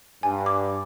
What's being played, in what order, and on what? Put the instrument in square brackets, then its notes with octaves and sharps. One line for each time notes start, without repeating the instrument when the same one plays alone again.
[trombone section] G2 [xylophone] G#5
[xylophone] D6